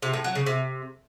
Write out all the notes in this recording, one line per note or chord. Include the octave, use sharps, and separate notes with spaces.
C3
A2
F#3
C#3
C3